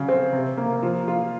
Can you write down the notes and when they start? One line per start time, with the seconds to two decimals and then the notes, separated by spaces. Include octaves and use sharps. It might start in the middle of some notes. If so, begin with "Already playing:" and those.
Already playing: C#3 F#3
0.08 C4
0.33 C3
0.57 A#3
0.82 F3
1.08 F4